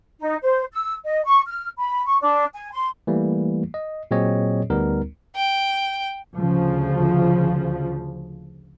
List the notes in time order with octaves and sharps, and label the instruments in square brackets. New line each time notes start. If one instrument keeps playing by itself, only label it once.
[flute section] D#4
C5
E6
D#5
C#6
F6
B5
C#6
D4
G#5
C6
[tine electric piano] E3 G3 A3 A#3
D#5
A#2 F#3 C4 G#4 C#5 D#5
D2 G3 B3 D#4 A#4
[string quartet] G5
[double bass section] D2 C#3 F3